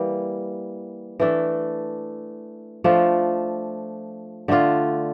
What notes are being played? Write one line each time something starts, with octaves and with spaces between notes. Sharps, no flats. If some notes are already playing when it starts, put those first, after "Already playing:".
Already playing: E3 G3 A#3
E3 A3 D4
F3 A3 D4 F4
D3 A3 D4 F4